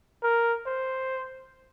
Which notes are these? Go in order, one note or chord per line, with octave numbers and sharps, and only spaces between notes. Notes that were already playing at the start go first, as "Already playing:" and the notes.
A#4
C5